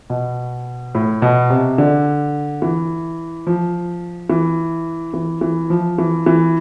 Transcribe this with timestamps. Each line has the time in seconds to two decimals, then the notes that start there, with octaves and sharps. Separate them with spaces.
0.10 B2
0.95 A2
1.22 B2
1.50 C3
1.78 D3
2.62 E3
3.47 F3
4.30 E3
5.14 E3
5.41 E3
5.70 F3
5.98 E3
6.26 E3